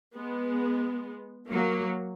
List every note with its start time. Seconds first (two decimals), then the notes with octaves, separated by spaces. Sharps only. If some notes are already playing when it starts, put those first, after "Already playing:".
0.15 G#3 B3
1.50 F#3 A#3